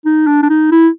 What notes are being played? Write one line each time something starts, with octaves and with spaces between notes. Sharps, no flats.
D#4
D4
D4
D#4
E4